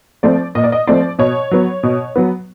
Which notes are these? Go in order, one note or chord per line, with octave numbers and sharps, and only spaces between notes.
F3 A3 C4 D5
A#2 D#5
D5
D#5
F3 A3 C4 D5
B2 C#5
F#3 B3
B2
F#3 B3